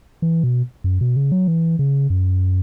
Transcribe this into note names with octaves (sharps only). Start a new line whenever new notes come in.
E3
B2
F#2
B2
C#3
F#3
E3
C#3
F#2